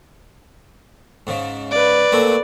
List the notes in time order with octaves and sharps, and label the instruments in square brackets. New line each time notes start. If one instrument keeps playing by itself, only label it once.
[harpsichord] G#2 C#3
[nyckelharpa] B4 D5
[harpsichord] A#2 A3 C4